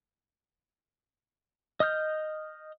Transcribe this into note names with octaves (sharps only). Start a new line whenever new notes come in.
D#5 D#6 F6 G6